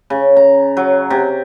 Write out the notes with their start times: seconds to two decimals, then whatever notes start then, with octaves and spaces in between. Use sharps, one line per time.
0.10 C#3
0.36 A#5
0.77 F#3
1.10 C3